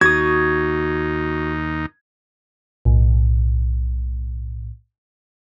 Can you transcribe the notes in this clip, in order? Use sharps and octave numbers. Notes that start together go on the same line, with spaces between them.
D#2 D#4 F#4 D#6 G#6
B1 A2